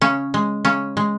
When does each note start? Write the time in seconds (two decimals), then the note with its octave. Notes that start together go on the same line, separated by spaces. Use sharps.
0.01 C#3 C#4
0.34 G#3
0.65 C#3 C#4
0.97 G#3